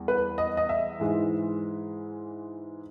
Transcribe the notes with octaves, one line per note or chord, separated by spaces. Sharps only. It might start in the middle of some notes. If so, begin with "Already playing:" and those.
Already playing: E2 G3
B4
D#5
D#5
E5
G#2 E3 G#3